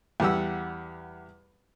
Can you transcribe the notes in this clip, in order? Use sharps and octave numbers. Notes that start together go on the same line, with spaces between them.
E2 G3 G4 F#5 E6